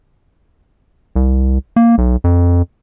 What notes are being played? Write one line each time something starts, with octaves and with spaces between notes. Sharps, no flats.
C2
A#3
B1
F2